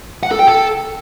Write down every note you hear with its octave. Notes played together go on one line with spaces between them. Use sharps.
F#5
A4
G5
A4